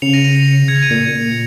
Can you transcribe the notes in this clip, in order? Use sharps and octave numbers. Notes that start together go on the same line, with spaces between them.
C#3 C#7 F7
A#6 D#7
A#6 D#7
C#7 F7
G#6 C#7
D#7
A#2 G#6 C#7